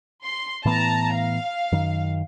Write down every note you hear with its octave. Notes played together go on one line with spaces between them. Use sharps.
C6
A2 E3 B3 A5 A#5
F5
F#2 D#3